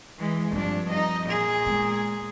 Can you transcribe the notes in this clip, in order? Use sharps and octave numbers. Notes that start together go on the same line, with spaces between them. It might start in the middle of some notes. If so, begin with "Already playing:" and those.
E3 G#3
G2 F3 C4 D4
D#4 D#5
A#2 G#4
G#3 B3